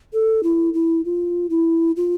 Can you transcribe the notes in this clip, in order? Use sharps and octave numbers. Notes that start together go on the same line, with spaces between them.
A4
E4
E4
F4
E4
F4